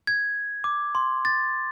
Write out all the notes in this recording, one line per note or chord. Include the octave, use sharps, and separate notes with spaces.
G#6
D6
C6
A6